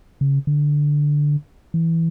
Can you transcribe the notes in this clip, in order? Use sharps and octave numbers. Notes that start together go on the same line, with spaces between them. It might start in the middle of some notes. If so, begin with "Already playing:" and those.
C#3
D3
E3